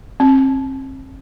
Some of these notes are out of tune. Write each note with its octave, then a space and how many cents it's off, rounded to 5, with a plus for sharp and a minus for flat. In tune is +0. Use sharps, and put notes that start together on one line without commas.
C4 +40